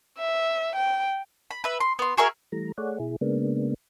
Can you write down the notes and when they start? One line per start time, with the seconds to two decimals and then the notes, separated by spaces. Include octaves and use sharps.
0.19 E5
0.75 G5
1.51 B5
1.64 B4 E5
1.80 C6
1.99 B3 C6
2.17 F#4 G#4 A#4 E5
2.52 E3 G3 A3 A#5
2.78 A3 G#4 C#5 D5 F#5
3.00 B2 E4 G#4
3.21 C#3 G#3 A#3 B3 D4